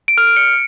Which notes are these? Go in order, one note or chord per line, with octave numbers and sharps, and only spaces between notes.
D7
F6
D7
C#7